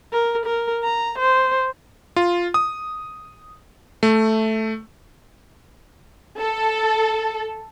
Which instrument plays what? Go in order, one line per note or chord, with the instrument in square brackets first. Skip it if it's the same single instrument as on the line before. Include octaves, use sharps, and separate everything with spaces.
[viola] A#4
A#4
A#5
C5
[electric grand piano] F4
D#6
A3
[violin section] A4